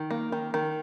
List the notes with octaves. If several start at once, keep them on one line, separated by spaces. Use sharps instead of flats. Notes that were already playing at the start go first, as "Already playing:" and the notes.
Already playing: D#3
A#3
D#3
D#3